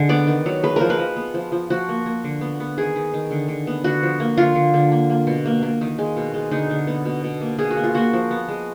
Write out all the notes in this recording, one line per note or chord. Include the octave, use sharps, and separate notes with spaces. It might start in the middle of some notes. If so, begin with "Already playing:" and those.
Already playing: D3 G#3
B3 D5
D#3
F#3
G#3 B4
F3 A#4
B4
F3
B3
F3
F3
F3 F#4
A#3
A#3
D3
B3
B3
D#3 G#4
D#3
D#3
D3
D3
B3
D3 F#4
F3
A#3
D3 F4
D3
D3
A#3
A#3
B2
A#3
A#3
D#3
G#3
B2
G#3
D3 D#4
D3
B3
B2
B2
A#3
B2 G#4
F#4
A#3
F4
A#3 F#4
F3
B3
G#3